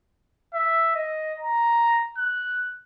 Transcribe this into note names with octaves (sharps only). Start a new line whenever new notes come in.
E5
D#5
A#5
F#6